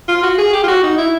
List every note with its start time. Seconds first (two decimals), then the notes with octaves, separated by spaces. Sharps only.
0.08 F4
0.23 F#4
0.38 G#4
0.53 G4
0.63 F4
0.68 F#4
0.83 D#4
0.98 E4